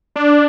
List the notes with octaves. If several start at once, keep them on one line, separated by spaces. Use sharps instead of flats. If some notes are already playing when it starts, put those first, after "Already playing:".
D4